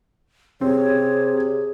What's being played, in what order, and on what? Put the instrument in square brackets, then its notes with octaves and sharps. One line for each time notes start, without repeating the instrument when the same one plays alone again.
[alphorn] C3 [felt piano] C4 [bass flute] G#4 [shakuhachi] C#5